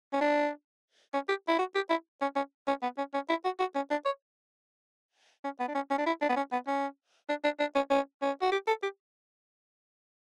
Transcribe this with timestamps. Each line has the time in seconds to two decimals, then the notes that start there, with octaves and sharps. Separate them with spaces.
0.13 C#4
0.21 D4
1.14 C#4
1.29 G4
1.48 E4
1.59 F#4
1.75 G4
1.90 E4
2.21 C#4
2.36 C#4
2.68 C#4
2.82 B3
2.97 C#4
3.14 C#4
3.29 E4
3.45 F#4
3.59 F#4
3.76 C#4
3.91 D4
4.05 C#5
5.44 C#4
5.60 B3
5.68 D4
5.75 C#4
5.91 C#4
5.98 D4
6.06 E4
6.22 D4
6.29 B3
6.37 C#4
6.52 B3
6.68 C#4
7.29 D4
7.44 D4
7.60 D4
7.75 C#4
7.90 C#4
8.22 C#4
8.42 F#4
8.52 G4
8.67 A4
8.83 G4